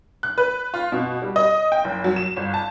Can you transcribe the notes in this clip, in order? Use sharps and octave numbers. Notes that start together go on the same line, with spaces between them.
F#6
B4
F4
B2
G3
D#5
G5
F#1
F#3
E7
G1
A5